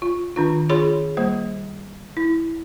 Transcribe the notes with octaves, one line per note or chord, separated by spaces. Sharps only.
F4
D#3 D4 F4
F4 G#4 C#5 B5 C6
G3 A#3 C5
E4